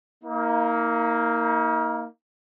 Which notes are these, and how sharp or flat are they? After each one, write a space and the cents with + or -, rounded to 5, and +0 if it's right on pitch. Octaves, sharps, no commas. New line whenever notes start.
A#3 -5 D#4 +40